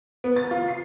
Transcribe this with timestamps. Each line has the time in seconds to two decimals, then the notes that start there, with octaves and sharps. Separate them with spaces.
0.24 B3
0.36 A6
0.51 F4
0.68 C7